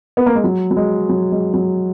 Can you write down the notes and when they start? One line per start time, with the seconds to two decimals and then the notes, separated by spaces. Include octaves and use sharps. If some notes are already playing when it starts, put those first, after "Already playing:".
0.17 B3
0.26 A#3
0.35 G#3
0.44 F#3
0.71 F#3
0.77 G#3
1.09 F#3
1.32 G#3
1.54 F#3